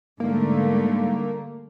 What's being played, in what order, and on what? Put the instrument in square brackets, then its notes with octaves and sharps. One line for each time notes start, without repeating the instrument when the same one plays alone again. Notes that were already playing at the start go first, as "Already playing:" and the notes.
[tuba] G#2 [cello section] D3 G3 A3 [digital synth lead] A#3